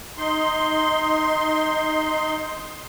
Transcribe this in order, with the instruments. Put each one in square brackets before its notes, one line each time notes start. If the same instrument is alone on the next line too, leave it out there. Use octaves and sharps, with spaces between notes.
[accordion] D#4 C6